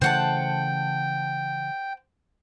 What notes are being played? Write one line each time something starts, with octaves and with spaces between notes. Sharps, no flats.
C#3 E3 A3 C5 F#5 G5 A5